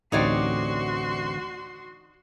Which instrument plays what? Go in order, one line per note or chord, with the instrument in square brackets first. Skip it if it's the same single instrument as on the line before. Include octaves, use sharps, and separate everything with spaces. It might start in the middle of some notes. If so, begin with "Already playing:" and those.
[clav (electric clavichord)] A1 D2 C4 [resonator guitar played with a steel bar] D#4 C#5 D5 [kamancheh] F#4 C6